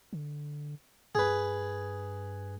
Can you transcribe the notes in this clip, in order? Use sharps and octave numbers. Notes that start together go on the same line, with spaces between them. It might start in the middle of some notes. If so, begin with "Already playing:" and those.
D3
G2 G#4 B4